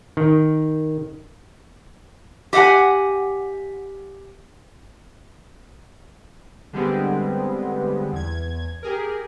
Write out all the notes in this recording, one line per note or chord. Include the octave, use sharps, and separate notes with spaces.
D#3
G4 D#5 F5 F#5 G#5
D3 G3 G#3 B3 C4
E2 G#6
G4 G#4 A#4